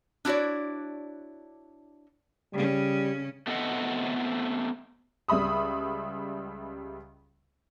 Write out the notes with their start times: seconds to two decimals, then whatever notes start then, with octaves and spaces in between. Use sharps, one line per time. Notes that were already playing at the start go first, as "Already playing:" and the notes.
0.25 D4 E4 F#4 C#5 D5
2.54 C#3 G3 C#4
3.47 A3 B3 C4 A4 D#5 F#5
5.28 C#2 G3 E5 B5 D#6